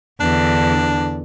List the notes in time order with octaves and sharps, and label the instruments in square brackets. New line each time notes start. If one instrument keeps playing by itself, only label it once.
[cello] E2 D3 [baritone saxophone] D4